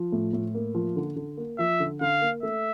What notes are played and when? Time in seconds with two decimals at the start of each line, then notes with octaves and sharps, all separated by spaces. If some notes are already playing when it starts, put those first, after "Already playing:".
Already playing: F3
0.12 A2
0.33 A2
0.55 A#3
0.75 F3
0.96 D3
1.16 D3
1.37 A#3
1.58 F3 E5
1.80 D3
2.01 D3 F5
2.21 A#3
2.43 A3 E5